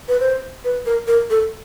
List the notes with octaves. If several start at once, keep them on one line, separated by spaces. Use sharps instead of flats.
B4
C5
B4
A#4
A#4
A4